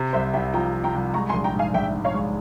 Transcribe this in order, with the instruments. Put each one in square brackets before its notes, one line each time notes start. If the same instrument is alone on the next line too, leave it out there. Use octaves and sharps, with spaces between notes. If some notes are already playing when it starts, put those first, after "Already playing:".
Already playing: [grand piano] C3
[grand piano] C2 [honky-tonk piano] C5 E5
[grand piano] C2 [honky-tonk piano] E5 G5
[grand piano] F3 [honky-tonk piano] G5 A#5
[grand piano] F3
[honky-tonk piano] G5 A#5
[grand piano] C2
[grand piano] G#3 [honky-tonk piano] A#5 C#6
[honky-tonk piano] G#5 C6
[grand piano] A#1
[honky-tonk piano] G5 A#5
[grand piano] G#2
[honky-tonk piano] F5 G#5
[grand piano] A#1 [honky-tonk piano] E5 G5
[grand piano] G#2
[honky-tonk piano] C#5 F5
[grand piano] G#3